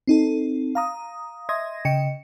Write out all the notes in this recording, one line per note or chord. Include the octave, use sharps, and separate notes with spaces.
C4 D#4 A4
F5 A#5 D#6
D#5 E5 C6 D#6 G#6 A#6
C#3 D#5 G5 C#7